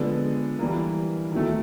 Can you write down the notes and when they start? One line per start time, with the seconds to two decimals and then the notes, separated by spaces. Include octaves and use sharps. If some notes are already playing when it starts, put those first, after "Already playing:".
Already playing: D3 F3 G#3 B3
0.59 E3 G3 A#3
1.32 D#3 F#3 A3